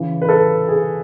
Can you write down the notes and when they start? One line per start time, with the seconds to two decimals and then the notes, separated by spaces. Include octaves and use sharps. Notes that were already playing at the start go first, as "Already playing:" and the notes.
Already playing: C#3 E3
0.22 B4
0.29 A4
0.68 G#4